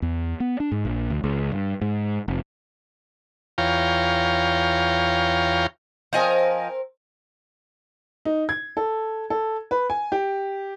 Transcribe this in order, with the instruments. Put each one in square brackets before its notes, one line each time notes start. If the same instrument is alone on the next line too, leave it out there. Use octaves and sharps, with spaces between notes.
[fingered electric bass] E2
B3
D4
G#2
A#1
D2
C#2
G2
G#2
F1
[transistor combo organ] E2 F4 C#5 F5 G5 A#5
[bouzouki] F3 D#5 G#5 [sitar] C4 A#4
[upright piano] D#4
G#6
A4
A4
B4
G#5
G4